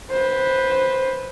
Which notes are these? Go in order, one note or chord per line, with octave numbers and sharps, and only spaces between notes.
B4 C5